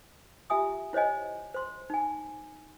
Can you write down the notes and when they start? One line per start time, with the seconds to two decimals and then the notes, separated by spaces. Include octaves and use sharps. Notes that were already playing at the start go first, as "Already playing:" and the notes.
0.50 F4 G4 E5 G#5 D#6
0.93 E4 C5 C#5 D#5 G#5
1.55 C5 C6
1.90 D#4 G#5